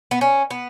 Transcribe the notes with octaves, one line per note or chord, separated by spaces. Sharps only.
B3
C#4
B3